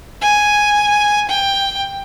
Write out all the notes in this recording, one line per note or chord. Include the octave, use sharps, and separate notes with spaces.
G#5
G5